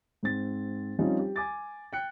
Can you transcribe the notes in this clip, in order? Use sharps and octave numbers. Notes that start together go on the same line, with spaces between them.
G#2 C4 A6
F3 G3 C4 C#4 D#4 F4
G4
G#5 D6 A6
G5 F#6 C#7